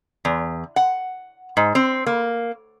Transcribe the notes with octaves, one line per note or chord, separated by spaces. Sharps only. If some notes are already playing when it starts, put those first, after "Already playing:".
E2
F#5
G#2
C4
A#3